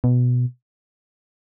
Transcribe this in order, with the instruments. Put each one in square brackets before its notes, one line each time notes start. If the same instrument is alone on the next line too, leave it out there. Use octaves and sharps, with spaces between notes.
[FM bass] B2